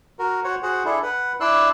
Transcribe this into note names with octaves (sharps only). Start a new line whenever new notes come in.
F#4 A#4
F#4 C5 C#5 F#5
F#4 G#4 C5 F#5
D4 E4 G#4 A4
B4 F#5
D4 E4 D5 C6 E6 F#6